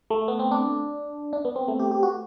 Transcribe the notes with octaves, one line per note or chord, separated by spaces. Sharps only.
A3
B3
C4
D4
D4
B3
C4
A3
G4
G4
F#4